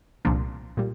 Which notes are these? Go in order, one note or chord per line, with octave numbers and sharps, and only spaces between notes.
C2 A#2 F3 A#3 D4
A#2 G3